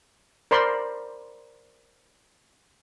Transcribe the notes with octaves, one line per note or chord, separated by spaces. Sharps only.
A#4 C5 D5 B5 C6